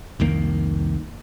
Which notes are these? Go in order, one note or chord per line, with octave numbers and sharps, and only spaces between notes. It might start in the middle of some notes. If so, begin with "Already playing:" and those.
C2 F2 D#3 A#3